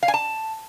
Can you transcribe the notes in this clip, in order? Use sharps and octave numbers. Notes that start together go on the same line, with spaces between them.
F5
G#5
A5